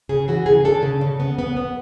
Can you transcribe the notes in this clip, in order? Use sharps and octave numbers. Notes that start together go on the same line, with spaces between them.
C#3 G#4
E3 F#4
C#3 G#4
D4 A4
C#3
C#3
B3
B3
B3